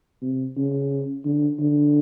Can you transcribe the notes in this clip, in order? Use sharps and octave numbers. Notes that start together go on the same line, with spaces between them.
C3
C#3
D3
D3